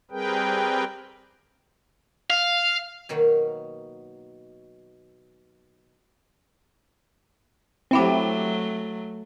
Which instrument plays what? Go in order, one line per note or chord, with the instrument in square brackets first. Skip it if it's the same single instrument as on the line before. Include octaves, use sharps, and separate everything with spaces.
[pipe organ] G3 C4 G#4 A#4 B4 G5
[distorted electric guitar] F5
[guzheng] B2 D#3 F#3 A#3
[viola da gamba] F#3 A3 [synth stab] C4 E4 G4